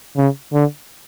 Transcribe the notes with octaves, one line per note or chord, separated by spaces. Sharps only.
C#3
D3